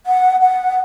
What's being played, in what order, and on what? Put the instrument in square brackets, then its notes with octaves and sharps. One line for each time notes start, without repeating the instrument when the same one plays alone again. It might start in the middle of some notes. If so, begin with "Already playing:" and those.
[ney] F#5
F#5